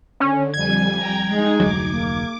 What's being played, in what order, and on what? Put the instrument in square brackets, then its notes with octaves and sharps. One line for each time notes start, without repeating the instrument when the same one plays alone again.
[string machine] D3 [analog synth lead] C#4
[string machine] F2 G3 G#5 [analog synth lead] G#6
[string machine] G5 A#5
[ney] G#3 [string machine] D#4 G#4
[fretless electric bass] F1 D2 F#3 [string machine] D6
[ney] A#3